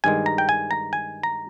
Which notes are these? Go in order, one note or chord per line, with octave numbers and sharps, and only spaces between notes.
G2 D#3 G#3 G#5
A#5
G5
G#5
A#5
G#5
A#5